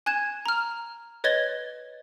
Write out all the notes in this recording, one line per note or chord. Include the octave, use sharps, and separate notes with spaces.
G#5 F#6 G#6 E7
A#5 F6
B4 C#5 D#5 G#6 A6 G7